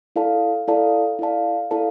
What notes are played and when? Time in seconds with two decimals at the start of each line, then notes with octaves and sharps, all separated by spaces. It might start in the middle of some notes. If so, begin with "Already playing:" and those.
0.16 E4 A4 D5 F5 A5
0.68 E4 A4 D5 F5 A5
1.19 E4 A4 D5 F5 A5
1.71 E4 A4 D5 F5 A5